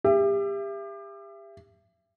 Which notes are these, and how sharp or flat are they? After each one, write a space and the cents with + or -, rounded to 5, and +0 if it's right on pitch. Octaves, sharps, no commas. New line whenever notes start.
G4 +30 E5 +30